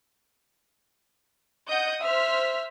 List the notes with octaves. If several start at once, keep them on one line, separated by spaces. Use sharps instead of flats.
D#5 F#5 D#6 G6
C5 E5 F6 B6